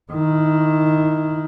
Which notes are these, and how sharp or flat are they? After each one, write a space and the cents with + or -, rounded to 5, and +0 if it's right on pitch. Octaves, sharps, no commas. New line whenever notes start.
D#3 +0 E4 -20